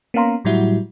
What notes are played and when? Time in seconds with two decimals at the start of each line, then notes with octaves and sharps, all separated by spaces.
0.14 A#3 B3 C#4 F5 A#5 C6
0.45 A2 F#3 G3 E4 F#4